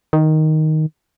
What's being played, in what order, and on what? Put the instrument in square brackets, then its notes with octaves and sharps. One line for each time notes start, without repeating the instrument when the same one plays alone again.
[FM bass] D#3